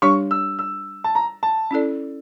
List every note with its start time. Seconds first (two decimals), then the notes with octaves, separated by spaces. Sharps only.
0.02 G3 D4 G4 C#5 C#6
0.31 E6
0.59 E6
1.04 A5
1.15 A#5
1.43 A5
1.71 C#4 E4 A4 D5